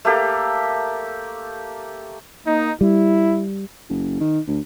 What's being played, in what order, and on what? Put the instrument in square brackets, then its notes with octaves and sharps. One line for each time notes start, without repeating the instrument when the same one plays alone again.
[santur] A3 A#3 G4 A4
[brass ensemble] A#3 D#4
[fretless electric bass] G3 [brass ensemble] E4
[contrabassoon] F#1
D#3
D2